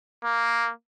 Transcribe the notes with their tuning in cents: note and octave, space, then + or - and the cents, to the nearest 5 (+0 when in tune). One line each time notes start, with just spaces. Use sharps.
A#3 +0